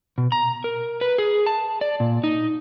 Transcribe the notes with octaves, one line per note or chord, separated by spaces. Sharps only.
B2
A#5
A#4
B4
G#4
A5
D5
A#2
D#4